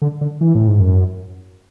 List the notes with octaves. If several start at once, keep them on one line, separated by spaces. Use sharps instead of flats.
D3
D3
E3
A2
G#2
F#2